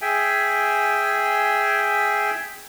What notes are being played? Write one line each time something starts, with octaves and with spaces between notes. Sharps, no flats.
G#4 E5 G5 G#5